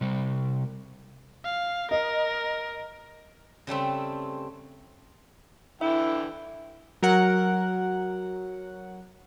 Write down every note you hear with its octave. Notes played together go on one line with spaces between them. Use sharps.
C3 G3
F5
A#4 D#5
C#3 G3 A3 C4
D3 E3 E4 E5 G5
F#3 A#4 F#5